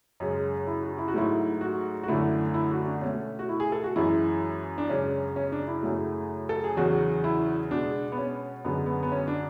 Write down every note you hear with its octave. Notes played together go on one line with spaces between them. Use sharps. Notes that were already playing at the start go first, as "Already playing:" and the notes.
F#2 C#3 G#3 C#4
E4
F#4
E4
F#4
G#2 F#3 A3 E4
F#4
F#4
F#2 D3 A3 E4
E4
F#4
D4
B2 A3 C#4
F#4
E4
G#4
A4
F#4
F#2 E3 G#3 E4
D4
F#2 C#3 G#3 C#4
C#4
D4
E4
F#2 C#3 F#3 A3
A4
G#4
E2 C#3 F#3 F#4
E4
B2 G#3 D4
B3
C#4
F#2 D3 G#3 B3
B3
B3
C#4
D4